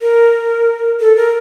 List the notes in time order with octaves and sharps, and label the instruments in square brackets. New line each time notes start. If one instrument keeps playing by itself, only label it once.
[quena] A#4
A4
A#4